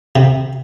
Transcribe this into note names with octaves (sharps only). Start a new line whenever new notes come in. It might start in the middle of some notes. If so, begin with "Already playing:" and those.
C3